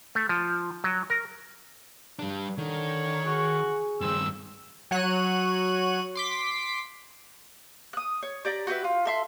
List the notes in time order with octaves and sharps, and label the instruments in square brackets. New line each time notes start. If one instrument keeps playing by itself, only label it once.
[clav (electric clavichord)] A3
F3
F#3
A#4
[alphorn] G2 [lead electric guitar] G3 D4
[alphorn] D3 [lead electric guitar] D#3 [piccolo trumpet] C#5
[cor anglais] F#4 [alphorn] G#4
[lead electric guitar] G2 D#3 [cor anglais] C4 [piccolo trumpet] E6
[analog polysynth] F#3 C#5 F#6 D#7
C6 D6 B6
[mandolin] D#6 F#6
C#5
G4 D5 A#5
F#4 G4 B4 E5
F4
A4 E5 C6